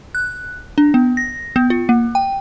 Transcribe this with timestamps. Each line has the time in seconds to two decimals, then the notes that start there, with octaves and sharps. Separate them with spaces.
0.15 F#6
0.78 D4
0.94 B3
1.17 A#6
1.56 B3
1.70 F4
1.89 A#3
2.15 G5